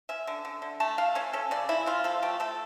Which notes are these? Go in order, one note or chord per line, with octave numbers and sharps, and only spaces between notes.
C#4 E5
D3
D3
D3
A3 A5
A3 F5
C#4 C#5
C#4 A4
C#3 D5
C#3 E4
C#3 F4
F3 A4
A3 G4
A3 A4